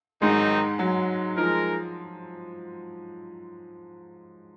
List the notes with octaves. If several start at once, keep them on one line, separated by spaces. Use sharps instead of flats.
G#2 D#3 F#3 G#3 C4 D#4
F#3
F3 G#3 D#4 A#4